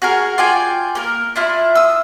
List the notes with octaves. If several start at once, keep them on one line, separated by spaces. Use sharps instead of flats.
F#4 G#4 A#4
F4 D5 G5 G#5
A#3 A#4
D4 E4 F4
D#6 E6